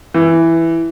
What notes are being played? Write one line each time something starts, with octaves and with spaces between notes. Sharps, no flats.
E3